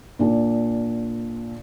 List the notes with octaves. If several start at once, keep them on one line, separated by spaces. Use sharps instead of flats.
A#2 D4